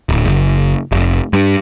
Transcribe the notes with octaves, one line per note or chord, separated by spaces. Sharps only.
D1
F#1
F1
G2